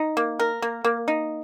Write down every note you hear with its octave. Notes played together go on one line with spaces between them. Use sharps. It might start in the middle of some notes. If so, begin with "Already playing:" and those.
Already playing: D#4
A#3
A#4
A#3
A#3
D#4